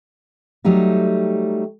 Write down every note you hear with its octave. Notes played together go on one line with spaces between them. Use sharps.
F#3 G3 A3 D#4 G4